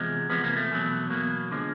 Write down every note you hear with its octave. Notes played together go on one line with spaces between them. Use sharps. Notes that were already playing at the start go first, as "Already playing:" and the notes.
Already playing: E2 C3 F3 G#3
E2 C3 F3 G#3 B3
A#3
A3
E2 B2 F#3
E2 B2 F#3 A#3
D3 F3 G#3